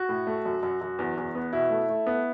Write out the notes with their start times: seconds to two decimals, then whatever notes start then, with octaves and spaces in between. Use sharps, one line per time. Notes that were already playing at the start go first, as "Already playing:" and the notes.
Already playing: F#4
0.09 A2
0.27 A3
0.46 F#2
0.63 F#2
0.81 F#2
0.99 E2
1.17 E2
1.35 B3
1.53 B2 E4
1.70 A3
1.89 A3
2.07 B3